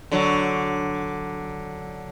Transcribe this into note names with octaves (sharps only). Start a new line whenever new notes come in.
D3 F#3